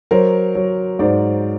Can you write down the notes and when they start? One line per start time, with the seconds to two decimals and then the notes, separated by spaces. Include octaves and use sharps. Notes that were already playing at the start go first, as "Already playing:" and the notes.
0.11 F#3 A#4 C5
0.55 F#3
0.99 G#2 C5 D5